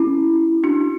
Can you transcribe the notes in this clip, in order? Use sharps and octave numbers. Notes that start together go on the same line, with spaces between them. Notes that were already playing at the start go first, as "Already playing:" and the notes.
Already playing: C#4 E4
D4 F#4